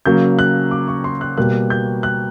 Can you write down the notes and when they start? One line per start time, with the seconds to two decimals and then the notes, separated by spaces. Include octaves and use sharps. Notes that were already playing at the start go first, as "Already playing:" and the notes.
0.06 C#3 F#3 A#3 G6
0.39 F#6
0.71 D6
0.88 C#6
1.04 C6
1.21 F#6
1.37 B2 G3 A#3 F#6
1.70 G6
2.03 F#6